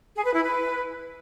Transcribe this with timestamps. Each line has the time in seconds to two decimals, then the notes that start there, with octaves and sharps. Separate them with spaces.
0.15 G#4
0.25 B4
0.34 E4
0.43 B4